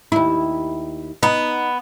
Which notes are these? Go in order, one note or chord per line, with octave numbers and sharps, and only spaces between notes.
D#2 E4
B3 D#4